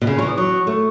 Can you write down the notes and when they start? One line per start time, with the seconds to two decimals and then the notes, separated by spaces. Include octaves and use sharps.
0.02 B2
0.07 C#3 B5
0.18 F#3 C#6
0.22 E3 D#6
0.37 F#3 C#6
0.67 A3 C#6